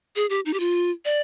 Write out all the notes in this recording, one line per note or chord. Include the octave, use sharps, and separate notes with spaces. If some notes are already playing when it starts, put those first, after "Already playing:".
G#4
G4
D#4
G4
F4
D5